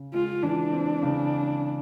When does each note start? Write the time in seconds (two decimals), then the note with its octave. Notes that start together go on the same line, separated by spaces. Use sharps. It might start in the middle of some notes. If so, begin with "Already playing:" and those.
Already playing: C#3
0.14 G#3 F4
0.43 E3 D4
0.73 C4
1.02 C#3